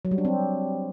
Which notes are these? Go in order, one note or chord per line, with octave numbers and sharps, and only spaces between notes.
F#3
G3
D4
C4